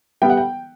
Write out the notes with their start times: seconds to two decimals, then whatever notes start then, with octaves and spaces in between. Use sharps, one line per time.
0.22 G3 B3 G5
0.30 F#5
0.37 G5